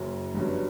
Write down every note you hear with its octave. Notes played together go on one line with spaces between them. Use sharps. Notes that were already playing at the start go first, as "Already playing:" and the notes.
Already playing: F#1 F#2 F#3
G1 G2 F#3